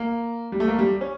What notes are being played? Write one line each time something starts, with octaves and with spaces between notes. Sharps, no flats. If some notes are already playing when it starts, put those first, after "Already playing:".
Already playing: A#3
G3
A3
A#3
G3
C#4